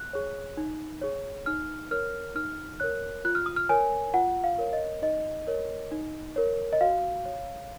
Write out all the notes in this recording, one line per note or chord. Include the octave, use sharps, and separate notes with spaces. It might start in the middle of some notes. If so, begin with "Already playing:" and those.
Already playing: F#6
G#4 C#5
D#4
G#4 C#5
D#4 F6
A#4 C#5 F6
D#4 F6
A#4 C#5 F#6
F4 F#6
F6
D#6
F6
A#4 C#5 G#5
F4 F#5
F5
A#4 C#5
D#5
D#4 D#5
A#4 C#5
D#4
A#4 C#5
D#5
F#4 F5
C#5